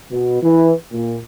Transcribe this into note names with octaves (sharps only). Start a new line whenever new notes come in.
B2
E3
A#2